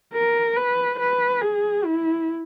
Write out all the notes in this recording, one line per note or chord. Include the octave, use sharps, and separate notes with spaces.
A#4
B4
B4
G#4
E4